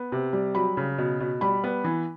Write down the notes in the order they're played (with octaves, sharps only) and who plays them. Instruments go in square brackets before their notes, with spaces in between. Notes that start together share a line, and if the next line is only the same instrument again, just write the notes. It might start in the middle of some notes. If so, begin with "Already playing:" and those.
Already playing: [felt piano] B3
C3
G3
F#3 B5
C#3
B2
B2
G3 B5
B3
E3